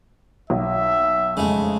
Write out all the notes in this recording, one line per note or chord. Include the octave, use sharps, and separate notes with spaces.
B1 E5
F2 C#3 G#3 A3